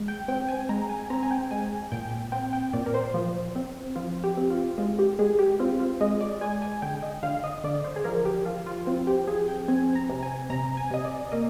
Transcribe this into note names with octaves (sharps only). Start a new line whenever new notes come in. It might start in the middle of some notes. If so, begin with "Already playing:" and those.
Already playing: G#3
G5
C4 G5
G#5
G#3 A#5
G#5
C4 A#5
G#5
G5
G#3 G#5
A#2 G5
C4 G5
G5
A#2 D5
A#4
C5
F3
C4
F3 F4
G4
C4
F4
G#3 F4
G4
G#3 G#4
G4
C4 F4
F4
G#3 D#5
D5
G#3 G#5
G#5
D3 G5
D#5
D3 F5
D#5
D3 D5
C5
G#4
F3 A#4
G4
F3 F4
F4
C4 F4
G4
F3 G#4
G5
C4 G#5
A#5
C3
G#5
C3 A#5
G#5
C3 D#5
D5
A#3 D#5